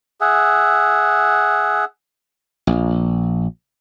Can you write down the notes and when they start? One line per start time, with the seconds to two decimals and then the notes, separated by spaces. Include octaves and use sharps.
0.21 G#4 E5 F#5
2.67 A#1